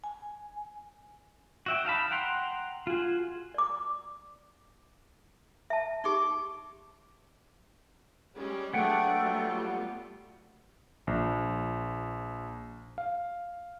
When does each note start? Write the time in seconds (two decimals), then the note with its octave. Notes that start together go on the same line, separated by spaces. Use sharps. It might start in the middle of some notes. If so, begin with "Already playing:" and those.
0.04 G#5
1.66 F#4 E5 G5
1.85 D#4 F5 A5 B5
2.11 F#5 G5 A#5 C6
2.87 F4 F#4 G#4
3.54 D5 D6
5.70 E5 A5
6.04 D#4 G4 C6 D6
8.36 G3 G#3 C#4
8.73 F#3 A3 B3 D4 G#4 F#5 G5
9.19 F#3 G3 F4
11.07 A#1
12.98 F5